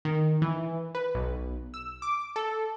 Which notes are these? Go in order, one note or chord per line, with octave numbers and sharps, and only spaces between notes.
D#3
E3
B4
B1
E6
D6
A4